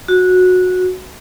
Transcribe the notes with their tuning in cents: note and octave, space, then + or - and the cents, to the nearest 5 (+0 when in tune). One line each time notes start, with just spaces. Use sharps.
F#4 -15